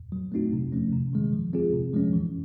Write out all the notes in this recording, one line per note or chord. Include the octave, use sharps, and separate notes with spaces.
F#3
A3 C4 D#4 F#4
C3
F3 A3 C#4
C3
D#3 G#3
F3
G#3 C4 F4 G#4
C3
F3 G#3 C#4
E3